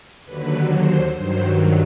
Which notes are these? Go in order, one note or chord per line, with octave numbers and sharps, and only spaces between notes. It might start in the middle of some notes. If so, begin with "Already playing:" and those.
D#2 D3 F#3 B4
C5
G2 D#3 F#3 C5